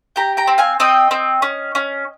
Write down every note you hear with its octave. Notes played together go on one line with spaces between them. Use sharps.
G4 G5 A#5
G5 A#5
C4
F5 G#5
C4 D#5 G5
C4
C#4
C#4